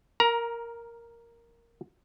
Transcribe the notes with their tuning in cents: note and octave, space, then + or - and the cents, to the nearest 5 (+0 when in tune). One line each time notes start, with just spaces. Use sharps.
A#4 +0 A#5 +20